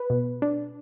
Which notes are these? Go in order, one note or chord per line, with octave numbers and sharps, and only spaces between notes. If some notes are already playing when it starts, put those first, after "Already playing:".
Already playing: B4
B2
D4